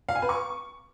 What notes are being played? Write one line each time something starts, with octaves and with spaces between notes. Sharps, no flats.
F5
G#5
B4
C#6